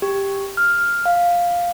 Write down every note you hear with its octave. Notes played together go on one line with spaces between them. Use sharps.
G4
F6
F5